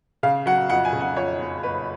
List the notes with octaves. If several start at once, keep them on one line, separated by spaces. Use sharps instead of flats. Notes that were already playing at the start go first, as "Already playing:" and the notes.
C#3 F5
F#3 F#5
F2 F#5
G#5
C#3
F#5
F2 C#5
F#1
F#1 B4